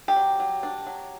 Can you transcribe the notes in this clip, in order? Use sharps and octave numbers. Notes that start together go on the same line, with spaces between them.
G4
F#3
F#3
D4
F#3